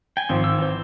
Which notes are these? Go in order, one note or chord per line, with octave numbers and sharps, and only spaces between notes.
G5 G#5
G#1 F3 C4
E6
E3 C5